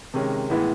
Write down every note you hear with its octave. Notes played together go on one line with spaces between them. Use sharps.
C3 D#3 G#3 C#4
A2 E3 G#3 B3 E4